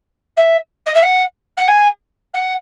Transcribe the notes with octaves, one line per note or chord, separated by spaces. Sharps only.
E5
D#5
E5
F#5
F#5
G#5
F#5